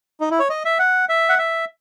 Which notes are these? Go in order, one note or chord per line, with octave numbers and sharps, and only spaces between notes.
D#4
E4
C#5
D#5
E5
F#5
E5
F#5
E5